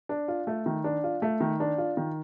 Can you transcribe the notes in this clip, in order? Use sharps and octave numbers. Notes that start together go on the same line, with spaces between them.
D4
F4
A3
D#3
D4
F4
A3
D#3
D4
F4
D#3